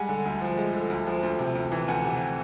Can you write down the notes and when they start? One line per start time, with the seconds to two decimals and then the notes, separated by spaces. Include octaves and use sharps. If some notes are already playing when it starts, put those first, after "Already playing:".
Already playing: G3 G#3 F#5 G#5
0.09 D3
0.25 D2
0.41 F3
0.57 G#3
0.74 D3
0.90 D2
1.07 F3
1.23 D2
1.39 C3
1.55 D2
1.72 E3
1.88 D2 F#5 G#5
2.04 C3